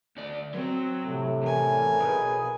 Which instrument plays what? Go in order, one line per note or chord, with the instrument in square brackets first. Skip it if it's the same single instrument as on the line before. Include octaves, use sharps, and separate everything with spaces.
[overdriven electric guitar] D2 D5
[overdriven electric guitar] F#3 [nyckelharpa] C4
[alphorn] A2 [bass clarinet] C3
[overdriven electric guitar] E2 [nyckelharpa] A#4 G#5
[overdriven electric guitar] B1 [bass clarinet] G#4 [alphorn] B4